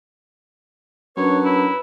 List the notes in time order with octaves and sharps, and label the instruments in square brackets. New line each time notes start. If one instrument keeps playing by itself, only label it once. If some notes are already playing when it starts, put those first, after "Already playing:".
[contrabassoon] F#2 [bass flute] D4 [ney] B4 [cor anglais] C#5
[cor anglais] E4